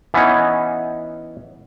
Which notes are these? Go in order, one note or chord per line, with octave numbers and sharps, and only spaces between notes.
E3 B3 C#4 D#4